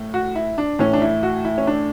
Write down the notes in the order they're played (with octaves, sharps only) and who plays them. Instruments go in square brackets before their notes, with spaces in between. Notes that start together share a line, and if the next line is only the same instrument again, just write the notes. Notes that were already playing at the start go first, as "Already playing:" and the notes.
Already playing: [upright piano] A2
F#4
E4
D4
A2 E3 C#4
D4
E4
F#4
E4
C#4
D4